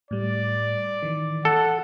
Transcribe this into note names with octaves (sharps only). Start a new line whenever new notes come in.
A2 G3 D5
D#3 E3
A4 F#5